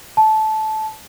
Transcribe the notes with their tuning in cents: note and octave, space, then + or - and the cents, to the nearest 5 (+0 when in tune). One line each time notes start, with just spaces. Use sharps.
A5 -15